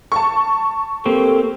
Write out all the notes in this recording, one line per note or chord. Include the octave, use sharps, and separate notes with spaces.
A5 C#6
A#3 C4 G4 A4